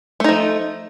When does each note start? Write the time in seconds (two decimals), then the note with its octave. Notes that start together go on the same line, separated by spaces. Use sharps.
0.20 A3
0.24 D#4
0.29 F3